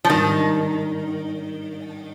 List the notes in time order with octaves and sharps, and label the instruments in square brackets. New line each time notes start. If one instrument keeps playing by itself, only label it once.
[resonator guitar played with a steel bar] F3
[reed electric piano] G#2 G3 D4 [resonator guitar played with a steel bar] D#3